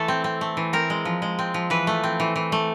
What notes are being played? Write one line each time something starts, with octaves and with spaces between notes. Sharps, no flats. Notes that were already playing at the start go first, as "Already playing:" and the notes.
Already playing: E3 A3 A4
C4
C4
A3
E3
C4 A#4
G#3
F3
G#3
C4
F3
E3 B4
A3
C4
E3
E3
A3